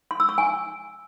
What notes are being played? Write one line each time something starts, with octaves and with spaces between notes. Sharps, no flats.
C6
E6
C#6
G#5